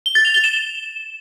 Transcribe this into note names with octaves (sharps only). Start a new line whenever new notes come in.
G7
A6
F7
G7
E7